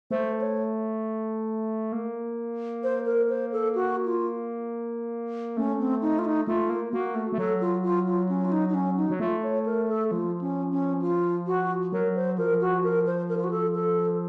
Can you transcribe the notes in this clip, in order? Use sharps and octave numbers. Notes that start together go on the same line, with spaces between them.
A3 C5
C#5
A#3
C5
A#4
C5
A4
F#4
F4
A3 C#4
C4
D#4
F4
D#4
A3 F4
A#3
A#3 F#4
A3
A3
F#3 A4
F4
F4
F4
C#4
F4
D#4
D#4
C#4
D#4
F#3
A3 F4
C#5
A#4
A4
F3 F4
C#4
C#4
F4
F#4
F#3 A#4
C5
F3 A#4
F#4
A#4
C5
A#4
F4
F#4
A4
A4